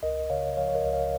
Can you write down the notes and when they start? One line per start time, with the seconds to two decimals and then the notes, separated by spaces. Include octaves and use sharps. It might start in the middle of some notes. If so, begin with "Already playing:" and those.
0.03 C#2 A#4 D#5
0.30 C#3 C#5 F5
0.57 F3 C#5 F5
0.68 C#5
0.75 A#4 D#5
0.84 C#2
0.93 C#5 F5